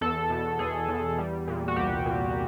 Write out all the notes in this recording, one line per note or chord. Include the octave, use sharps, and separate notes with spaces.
E2 A4
B2
E2 G#4
E2
G3
A#2
F#4
C2 G4
A#2